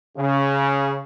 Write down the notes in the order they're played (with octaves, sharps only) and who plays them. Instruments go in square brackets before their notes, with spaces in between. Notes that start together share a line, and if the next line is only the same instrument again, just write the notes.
[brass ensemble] C#3